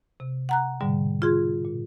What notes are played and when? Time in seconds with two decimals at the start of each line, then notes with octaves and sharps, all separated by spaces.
0.20 C3
0.49 F#5 A#5 F#6
0.81 G#2 B2 D3 G3
1.22 F4 F#4 G#4 C6 G#6
1.65 A#2